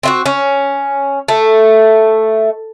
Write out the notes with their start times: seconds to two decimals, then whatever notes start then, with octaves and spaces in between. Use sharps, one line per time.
0.03 C4 F4 F#4
0.26 C#4
1.28 A3